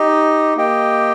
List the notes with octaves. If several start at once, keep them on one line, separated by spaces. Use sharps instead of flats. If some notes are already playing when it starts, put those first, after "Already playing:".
Already playing: D#4 G4 D#5
A#3 G4 D#5 G5